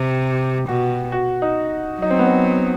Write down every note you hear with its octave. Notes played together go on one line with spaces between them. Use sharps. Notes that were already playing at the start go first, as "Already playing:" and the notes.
Already playing: C3 G4
B2 F#4
F#4
D#4
F#3 D#4
C4
B3
C4